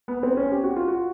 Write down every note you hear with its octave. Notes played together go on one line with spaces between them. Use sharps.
B3
C4
C#4
G4
F#4
F4
F#4